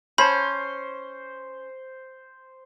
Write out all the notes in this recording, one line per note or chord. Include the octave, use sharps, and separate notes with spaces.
C#4 C5 A5 B5